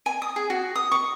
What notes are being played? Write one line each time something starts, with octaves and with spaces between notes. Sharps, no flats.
G#5
D#6
G#4
F#4
D#6
C#6